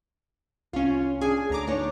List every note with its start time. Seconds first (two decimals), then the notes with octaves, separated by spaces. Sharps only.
0.73 C2 C#4 F4
1.21 C#4 D4 G#4 G#5
1.50 D2 A#5 D6
1.67 D4 D#4 C#5